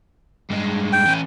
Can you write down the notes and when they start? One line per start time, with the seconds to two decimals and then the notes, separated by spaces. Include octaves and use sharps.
0.50 G2 G#3
0.93 G5
1.06 E3 C#4